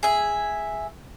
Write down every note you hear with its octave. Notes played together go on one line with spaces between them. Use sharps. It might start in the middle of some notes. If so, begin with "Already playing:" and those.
G#4 E5